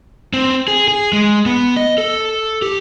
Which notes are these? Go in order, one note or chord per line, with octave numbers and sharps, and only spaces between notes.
C4
G#4
G#4
G#3
B3
D#5
A4
G4